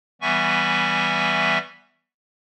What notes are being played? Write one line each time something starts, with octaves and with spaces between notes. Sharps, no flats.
E3 G3 B3 E5 G#5 C#6